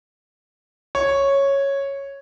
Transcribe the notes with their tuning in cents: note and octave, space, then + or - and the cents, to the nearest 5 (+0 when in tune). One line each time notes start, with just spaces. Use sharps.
C#5 -5